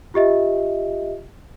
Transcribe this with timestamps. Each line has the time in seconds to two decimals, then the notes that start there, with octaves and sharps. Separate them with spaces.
0.14 F4 G4 D#5 E5